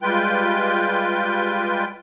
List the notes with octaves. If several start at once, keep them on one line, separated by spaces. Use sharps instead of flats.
G3 G#3 F4 B4 G5 G6